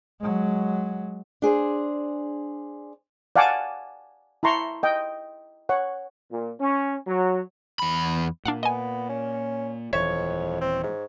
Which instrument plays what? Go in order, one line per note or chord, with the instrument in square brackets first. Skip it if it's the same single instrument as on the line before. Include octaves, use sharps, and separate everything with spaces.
[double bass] F#3 G#3
[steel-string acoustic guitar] D4 G#4 C5
[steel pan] D5 F5 F#5 G#5 A5 D6
E4 A5 A#5 C6 C#6
D#5 G5
C#5 F#5
[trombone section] A#2
C#4
F#3
[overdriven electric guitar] E2 B5
[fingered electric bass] A#2 [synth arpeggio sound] D4 F5 F#5
[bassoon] B3 [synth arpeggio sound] D#5 G#5
[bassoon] C#4
[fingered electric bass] D#1 E3 [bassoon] F2 [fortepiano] C#5 [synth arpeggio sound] E5
[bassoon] C4
G#2